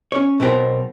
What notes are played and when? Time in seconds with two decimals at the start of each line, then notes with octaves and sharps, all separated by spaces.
0.12 C#4 C#5
0.40 B1 B2 C4 G4 A#4 C5